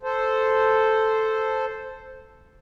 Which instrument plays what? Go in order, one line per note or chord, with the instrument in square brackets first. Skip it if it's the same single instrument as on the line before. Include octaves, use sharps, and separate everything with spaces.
[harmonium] A4 C5